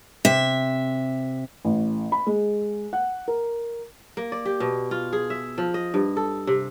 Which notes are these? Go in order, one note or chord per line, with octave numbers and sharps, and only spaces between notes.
C3 E5
A1
B5
G#3
F#5
A#4
A#3
D5
G4
B2
F4
G#4
E5
F3
D#5
G2
A4
C3